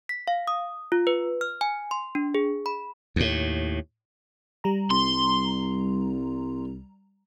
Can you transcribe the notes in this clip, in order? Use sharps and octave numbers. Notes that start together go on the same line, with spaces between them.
B6
F5
D#6
F4
B4
F6
G#5
C6
D4
G#4
B5
D#2 A2
G3 A#5
C2 C6